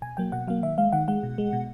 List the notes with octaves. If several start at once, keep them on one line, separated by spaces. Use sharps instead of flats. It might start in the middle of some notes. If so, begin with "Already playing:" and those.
B2 G#5
F#3 A#3 G5
B2 F#5
F#3 A#3 F5
D#3 E5
G#3 F5
D#3 F#5
G#3 F#5
B2
G#3
B2